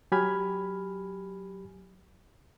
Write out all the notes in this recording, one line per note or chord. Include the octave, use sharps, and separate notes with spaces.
F#3 G4 G#5 B5 F6 G#6